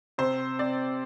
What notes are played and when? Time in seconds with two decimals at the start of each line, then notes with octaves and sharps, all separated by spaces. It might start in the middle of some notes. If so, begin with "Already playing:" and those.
0.18 C3 C5
0.59 C4 D5